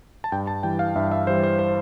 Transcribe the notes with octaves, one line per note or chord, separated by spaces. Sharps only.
A5
G2 G5
A5
E3 G3 G5
F5
G2 E5
E5
E3 G3 C5
C5
C5